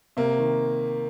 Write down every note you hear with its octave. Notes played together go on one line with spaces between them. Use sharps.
C3 A#3
D#3